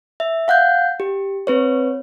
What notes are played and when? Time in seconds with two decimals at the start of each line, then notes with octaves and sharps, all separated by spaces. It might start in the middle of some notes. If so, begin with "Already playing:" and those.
0.20 E5
0.48 F5 F#5 F#6 G6
1.00 G4
1.47 C4 B4 C#5